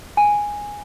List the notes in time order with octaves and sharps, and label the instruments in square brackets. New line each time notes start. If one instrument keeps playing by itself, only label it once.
[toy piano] G#5